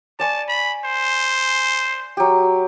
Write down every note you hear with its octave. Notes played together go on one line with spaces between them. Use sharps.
D5 G#5 A5 C#6
B5
C5
F#3 G4